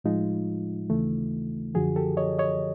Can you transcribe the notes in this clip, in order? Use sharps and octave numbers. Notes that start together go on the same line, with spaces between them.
A2 F3 G#3 D#4 F4
D#2 C#3 E3 A3
F#2 D3 F3 F#4 G#4
G4 A4
C#5 D#5
C#5 D#5